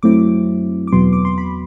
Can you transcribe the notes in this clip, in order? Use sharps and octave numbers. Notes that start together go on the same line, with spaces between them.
F#2 F#3 A3 C4 E4 D6
D6
E2 B2 F#3 B3 C6
D6
C6
B5